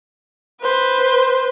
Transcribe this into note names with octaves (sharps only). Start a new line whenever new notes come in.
B4 C5